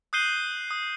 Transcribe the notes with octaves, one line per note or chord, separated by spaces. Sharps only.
D#6 F#6 G6 C7 D#7 G7
D#6